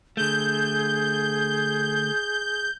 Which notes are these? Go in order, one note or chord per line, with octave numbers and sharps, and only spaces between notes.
D3 A3 G#4 G6